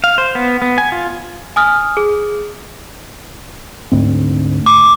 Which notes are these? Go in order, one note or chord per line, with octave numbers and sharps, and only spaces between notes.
F5
C5
B3
B3
G#5
F4
G#5 D#6 F6
G#4
D2 G#2 C4
D6